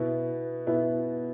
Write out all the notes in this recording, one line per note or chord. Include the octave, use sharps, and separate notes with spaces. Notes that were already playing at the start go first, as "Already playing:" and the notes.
Already playing: B2 B3 E4
B2 B3 E4